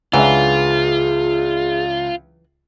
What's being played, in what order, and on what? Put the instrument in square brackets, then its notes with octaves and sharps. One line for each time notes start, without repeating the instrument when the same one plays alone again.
[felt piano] C#2 D4 E5 [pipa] E3 F#3 [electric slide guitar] F4 [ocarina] G#4